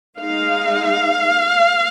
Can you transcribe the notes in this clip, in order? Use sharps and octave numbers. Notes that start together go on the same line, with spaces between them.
G#3 D#4 F5